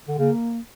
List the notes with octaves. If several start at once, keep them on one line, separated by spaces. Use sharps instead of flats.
D3
C#3 A#3